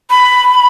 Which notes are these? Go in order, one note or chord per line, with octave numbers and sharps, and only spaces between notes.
B5